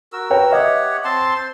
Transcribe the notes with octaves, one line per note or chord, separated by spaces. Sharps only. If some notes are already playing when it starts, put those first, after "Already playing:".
F#4 A#4 E6
B4 C#5 G5
G4 C#5 D#5 E5 F#5
C4 A5 C6
C5 C6